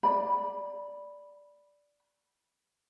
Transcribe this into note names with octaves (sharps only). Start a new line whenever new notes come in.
D5 B5